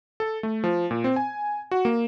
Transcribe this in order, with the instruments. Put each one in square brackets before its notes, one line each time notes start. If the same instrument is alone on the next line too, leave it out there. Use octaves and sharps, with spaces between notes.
[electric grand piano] A4
A3
F3
A#2
C4
G#5
F#4
A#3